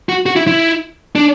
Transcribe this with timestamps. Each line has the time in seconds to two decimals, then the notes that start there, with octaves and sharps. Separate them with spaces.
0.09 F#4
0.26 F#4
0.36 E4
0.48 E4
1.16 D4